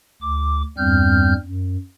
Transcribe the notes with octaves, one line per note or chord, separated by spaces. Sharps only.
D2 D6
E2 G2 G3 C4 F6 G6
F#2